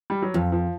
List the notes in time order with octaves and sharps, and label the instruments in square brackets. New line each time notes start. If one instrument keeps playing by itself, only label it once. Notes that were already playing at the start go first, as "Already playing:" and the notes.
[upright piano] G3
F#3
[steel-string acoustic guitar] F2 [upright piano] F3
[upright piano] F3